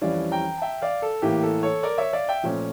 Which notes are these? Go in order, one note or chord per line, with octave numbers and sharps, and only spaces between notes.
F2 E3 G3 C#4 D5 F5
G5 A#5
A5
E5 G5
D5 F5
A4
A2 E3 A#3 G4
A4
A4 C#5
A#4 D5
C#5 E5
D5 F5
E5 G5
A#2 F3 A3 C#4